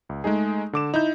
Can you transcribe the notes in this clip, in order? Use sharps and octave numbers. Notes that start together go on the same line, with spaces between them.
C#2
G#3 A3 D#4 G#4
D3 D6 E7
D#4 E4 G6